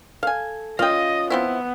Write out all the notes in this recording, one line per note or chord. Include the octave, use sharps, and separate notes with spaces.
A4 F5 G#5
C#4 F4 D#5 F5 G5
F3 B3 C4 E4